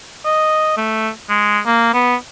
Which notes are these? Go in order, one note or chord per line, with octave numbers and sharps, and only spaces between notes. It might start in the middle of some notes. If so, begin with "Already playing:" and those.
D#5
A3
G#3
A#3
B3